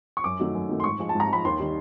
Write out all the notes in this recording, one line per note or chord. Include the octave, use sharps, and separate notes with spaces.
C#6
F#2 D6
D#3 F#3 A3
F#2
D#3 F#3 A3
C6
G#2 C#6
F3 G#3
A5
G#2
A#5
F3 G#3 B5
D#2 C6
D#3 G3